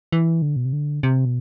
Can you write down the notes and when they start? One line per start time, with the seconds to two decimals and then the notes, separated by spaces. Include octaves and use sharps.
0.12 E3
0.42 D3
0.56 B2
0.65 C3
0.73 D3
1.03 C3
1.25 B2